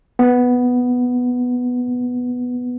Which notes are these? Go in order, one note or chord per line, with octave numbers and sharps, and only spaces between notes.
B3